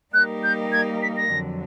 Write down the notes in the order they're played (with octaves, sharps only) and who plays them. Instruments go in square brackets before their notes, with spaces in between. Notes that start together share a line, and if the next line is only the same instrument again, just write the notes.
[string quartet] G3 A#3 D#4 G4 A#4 [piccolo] F#6
[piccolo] G6
G#6
B6
A#6
[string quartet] F2 D3 F#3